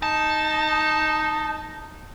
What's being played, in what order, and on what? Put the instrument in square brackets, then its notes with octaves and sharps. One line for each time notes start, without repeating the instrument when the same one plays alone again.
[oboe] D#4 [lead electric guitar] A5